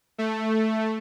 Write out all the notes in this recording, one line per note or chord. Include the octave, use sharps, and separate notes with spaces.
A3